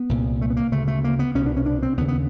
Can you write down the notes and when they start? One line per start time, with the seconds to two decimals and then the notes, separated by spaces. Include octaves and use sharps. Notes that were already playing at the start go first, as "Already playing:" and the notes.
Already playing: B3
0.09 C2 A#2
0.42 A3
0.50 B3
0.57 A#3
0.72 D2 C#3 A3
0.88 A3
1.04 A#3
1.19 B3
1.35 C2 B2 C#4
1.46 D4
1.57 C#4
1.66 D4
1.83 C4
1.97 D#2 B3
2.00 C#3
2.08 B3